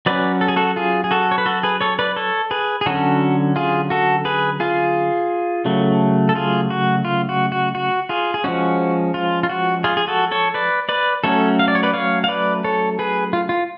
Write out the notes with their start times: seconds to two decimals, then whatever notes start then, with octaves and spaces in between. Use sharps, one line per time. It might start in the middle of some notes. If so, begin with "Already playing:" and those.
0.06 F#3 C#4 B4 D5
0.41 A4
0.48 G#4
0.56 F#4 A4
0.76 F4 G#4
1.04 G#4
1.11 F#4 A4
1.31 C#5
1.38 B4
1.46 F#4 A4
1.63 G#4 B4
1.81 A4 C#5
1.99 B4 D5
2.16 A4 C#5
2.51 G#4 B4
2.81 G#4
2.86 D3 F#3 C#4 F#4 A4
3.56 F4 G#4
3.90 F#4 A4
4.25 G#4 B4
4.60 F4 G#4
5.65 C#3 F#3 A3
6.29 A4
6.35 F4 G#4
6.70 F#4
7.05 F4
7.29 F#4
7.52 F#4
7.75 F#4
8.09 F4 G#4
8.34 G#4
8.44 F3 G#3 C#4 F#4
9.14 F4
9.43 F4
9.49 F#4
9.84 F4 G#4
9.97 G#4
10.07 F#4 A4
10.31 A4 C#5
10.54 B4 D5
10.89 B4 D5
11.24 F#3 A3 C#4 A4 C#5
11.59 F5
11.68 D5
11.75 C#5
11.83 B4 D5
11.94 C#5 F5
12.24 F5
12.28 B4 D5
12.64 A4 C#5
12.99 G#4 B4
13.33 F4
13.49 F4